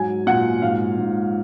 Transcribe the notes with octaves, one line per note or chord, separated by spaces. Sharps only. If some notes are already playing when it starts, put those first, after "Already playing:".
Already playing: G#2 F#3 G#5
A#2 F#5
G#2 F5
G#2